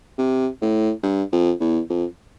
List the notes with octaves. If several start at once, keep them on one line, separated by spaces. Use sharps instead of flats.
C3
A2
G2
F2
E2
F2